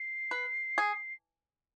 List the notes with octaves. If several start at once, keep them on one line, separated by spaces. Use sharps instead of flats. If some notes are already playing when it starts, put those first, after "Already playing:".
Already playing: C7
B4
G#4